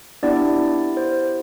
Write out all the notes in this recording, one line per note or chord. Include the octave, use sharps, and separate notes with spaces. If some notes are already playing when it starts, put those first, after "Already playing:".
B3 D4 E4 G4 D5
C5